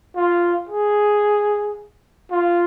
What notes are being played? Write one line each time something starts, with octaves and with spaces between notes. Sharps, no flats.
F4
G#4
F4